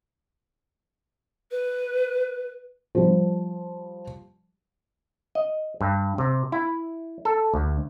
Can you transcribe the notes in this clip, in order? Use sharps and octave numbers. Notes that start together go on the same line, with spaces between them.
B4
F3 G3
D#5
G2
C3
E4
A4
D2